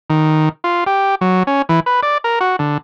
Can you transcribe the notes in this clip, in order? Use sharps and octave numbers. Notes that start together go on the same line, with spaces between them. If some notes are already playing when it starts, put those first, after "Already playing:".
D#3
F4
G4
F#3
C#4
E3
B4
D5
A#4
F#4
D3